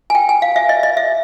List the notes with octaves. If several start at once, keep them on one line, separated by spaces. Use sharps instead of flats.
G#5
G5
G#5
F5
E5
D#5
D#5
E5